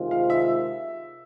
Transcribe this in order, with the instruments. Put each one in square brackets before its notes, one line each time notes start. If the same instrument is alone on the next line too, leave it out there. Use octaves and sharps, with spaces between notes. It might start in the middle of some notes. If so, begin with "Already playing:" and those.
Already playing: [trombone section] C3 D#3 G#3 C4 F4
[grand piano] F5
E5